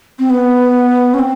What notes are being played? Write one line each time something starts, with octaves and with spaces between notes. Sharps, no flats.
C4
B3
C#4
C4